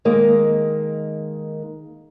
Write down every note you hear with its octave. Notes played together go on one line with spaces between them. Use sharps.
D#3 G#3 A#3